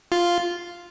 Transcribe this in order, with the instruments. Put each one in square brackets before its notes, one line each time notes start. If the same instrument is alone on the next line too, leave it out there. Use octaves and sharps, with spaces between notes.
[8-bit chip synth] F4